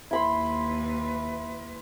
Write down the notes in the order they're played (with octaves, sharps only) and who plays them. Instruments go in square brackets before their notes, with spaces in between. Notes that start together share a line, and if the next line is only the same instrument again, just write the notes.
[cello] D#2 B4 [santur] E4 B5 C6